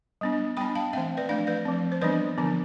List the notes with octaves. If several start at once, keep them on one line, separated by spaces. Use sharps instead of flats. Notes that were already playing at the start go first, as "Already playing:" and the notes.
G3 B3 D4
G3 B3 D4 G5 B5
F5 A5
E3 A3 C4 E5 G5
B4 D5
F3 A3 D4 D5 F5
B4 D5
F3 C4
C5
E3 G3 B3 D4 B4 D5
D3 F3 B3 D4